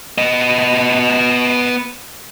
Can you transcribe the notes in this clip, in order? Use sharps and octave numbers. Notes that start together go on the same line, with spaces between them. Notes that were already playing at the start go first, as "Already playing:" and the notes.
B3 D#5